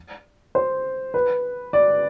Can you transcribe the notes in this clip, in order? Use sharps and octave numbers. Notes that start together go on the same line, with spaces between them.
C5
B4
D5